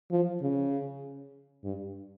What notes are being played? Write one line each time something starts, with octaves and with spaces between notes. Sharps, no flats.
F3
C#3
G2